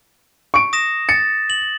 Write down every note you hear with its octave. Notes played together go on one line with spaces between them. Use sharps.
C#6 D7
D#6 A#6 E7
A6 C#7
F#7